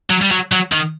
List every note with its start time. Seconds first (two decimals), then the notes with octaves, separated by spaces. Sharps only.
0.10 F#3
0.22 G3
0.31 F#3
0.52 F#3
0.72 D#3